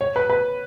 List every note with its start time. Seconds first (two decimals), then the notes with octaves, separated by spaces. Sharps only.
0.01 C#5
0.16 B4
0.30 B4